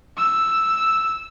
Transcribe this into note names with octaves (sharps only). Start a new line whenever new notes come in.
E6